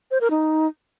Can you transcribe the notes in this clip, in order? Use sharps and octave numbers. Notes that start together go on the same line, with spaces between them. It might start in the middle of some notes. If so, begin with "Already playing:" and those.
C5
A#4
D#4